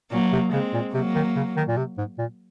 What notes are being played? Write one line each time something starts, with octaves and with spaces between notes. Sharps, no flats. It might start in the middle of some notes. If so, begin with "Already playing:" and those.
A#2 F#3 A#3
C3
C#3 G#3 C4
A#2
C3 F#3 A#3
D#3
C#3
D#3
A#2
C3
G#2
A#2